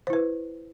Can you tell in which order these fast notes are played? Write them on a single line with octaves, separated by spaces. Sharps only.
C5 E4 B4